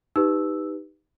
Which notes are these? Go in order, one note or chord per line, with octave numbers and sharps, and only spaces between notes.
D#4 G4 B4 E6